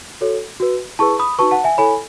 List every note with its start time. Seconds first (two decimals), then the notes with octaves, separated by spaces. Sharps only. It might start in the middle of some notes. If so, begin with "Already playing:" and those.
0.21 F#4 A4 C#5
0.60 F#4 B4
0.99 E4 G#4 B4 A5 C#6
1.19 B5 D#6
1.39 D#4 F#4 B4 A5 C#6
1.51 F#5 A5
1.64 E5 G#5
1.78 E4 A4 C#5 G#5 B5